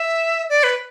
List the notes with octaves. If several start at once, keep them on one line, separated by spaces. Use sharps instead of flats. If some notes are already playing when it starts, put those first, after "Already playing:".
Already playing: E5
D5
B4